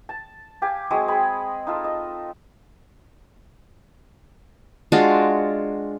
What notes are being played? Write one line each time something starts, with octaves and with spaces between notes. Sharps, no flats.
A5
G4 F5 G#5
F#3 G#3 C4 D#6
C4 G#4 B5
D#4 F4 A4
D#5
G#3 D4 F4 F#4